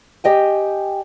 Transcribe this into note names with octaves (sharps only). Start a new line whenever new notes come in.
G4 D#5 G5 G#5